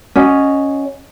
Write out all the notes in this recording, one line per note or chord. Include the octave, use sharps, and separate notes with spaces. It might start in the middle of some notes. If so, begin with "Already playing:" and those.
C#4 F#4 D#5